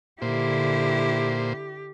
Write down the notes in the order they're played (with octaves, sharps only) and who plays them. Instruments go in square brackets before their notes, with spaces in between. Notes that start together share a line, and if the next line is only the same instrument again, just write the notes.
[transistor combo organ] A#2 C5 [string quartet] D3 E4 [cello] G4